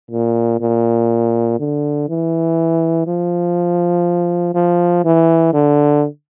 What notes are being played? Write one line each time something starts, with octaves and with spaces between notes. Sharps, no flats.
A#2
A#2
D3
E3
F3
F3
E3
D3